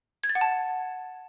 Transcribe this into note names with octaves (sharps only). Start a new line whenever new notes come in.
G#6
A6
F#5
A5